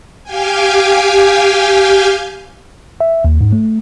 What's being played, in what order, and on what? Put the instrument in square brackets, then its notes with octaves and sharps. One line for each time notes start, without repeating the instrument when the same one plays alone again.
[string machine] G4 F5 G5 G#5
[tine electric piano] E5
D#2
G#2
A3